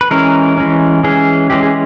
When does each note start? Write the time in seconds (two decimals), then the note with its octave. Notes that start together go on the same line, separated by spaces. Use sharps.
0.01 B4
0.11 E3 G#3 C#4 A#4
0.57 E3 G#3 C#4
1.03 E3 G#3 C#4 G#4
1.50 E3 G#3 C#4 G4
1.63 G#4